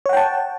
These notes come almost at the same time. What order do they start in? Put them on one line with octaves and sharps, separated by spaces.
C#5 F#5 G5 A5